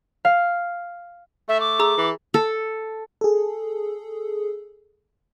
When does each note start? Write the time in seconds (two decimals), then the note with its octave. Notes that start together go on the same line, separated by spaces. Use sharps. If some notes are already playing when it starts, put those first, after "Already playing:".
0.25 F5
1.49 A3 E5
1.61 D6
1.79 G#4 A#5 E6
1.97 E3
2.34 A4
3.21 G#4 A4